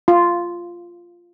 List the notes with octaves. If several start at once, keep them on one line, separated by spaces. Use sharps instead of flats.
F4